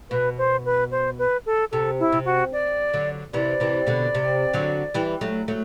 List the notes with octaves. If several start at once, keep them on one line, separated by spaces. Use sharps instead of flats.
B2 B4
C5
B4
C5
B4
A4
C3 A4
E4
C3
F#4
D5
D3 F#3
C3 E3 D5
C3 E3
B2 D3
C3
D3 F#3
E3 G3
F#3 A3
F#3 A3